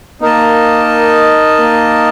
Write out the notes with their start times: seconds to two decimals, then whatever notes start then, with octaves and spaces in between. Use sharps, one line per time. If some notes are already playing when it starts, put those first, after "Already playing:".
0.21 A#3 D#4 A#4 D#5 A5
1.59 A#3